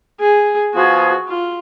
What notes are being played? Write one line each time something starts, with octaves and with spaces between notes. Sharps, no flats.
G#4
F3 B3 F4 F#4 G#4
F4